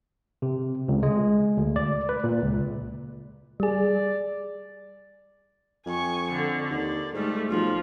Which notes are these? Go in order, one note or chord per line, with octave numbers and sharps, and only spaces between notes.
C3
C#2
G#3
D2
D5
B4
A#2
C#2
G3 G#4 D5
F2 G#5 C#6
D3
D#2 D5
G#2 G3 A3
B1 F3